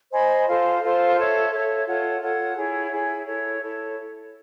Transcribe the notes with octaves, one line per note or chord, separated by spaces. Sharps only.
C5 D#5 G#5 B5
F4 A4 C5 F5
F4 A4 C5 F5
A4 C#5 E5
A4 C#5 E5
F4 A4 C#5 F#5
F4 A4 C#5 F#5
E4 G#4 C#5
E4 G#4 C#5
E4 A4 C#5
E4 A4 C#5